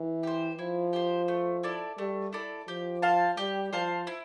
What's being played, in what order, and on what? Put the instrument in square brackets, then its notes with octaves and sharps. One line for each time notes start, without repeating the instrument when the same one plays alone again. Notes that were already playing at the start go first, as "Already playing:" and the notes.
Already playing: [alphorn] E3
[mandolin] G4 C5
[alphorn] F3 [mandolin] E4
[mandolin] G4 C5
A3
E4 A4 D5
[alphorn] G3 [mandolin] A3
[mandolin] E4 A4 D5
[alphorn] F3 [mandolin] G4
[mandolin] C5 F5 A5
[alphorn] G3 [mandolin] G4
[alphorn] F3 [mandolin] C5 F5 A5
[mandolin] E4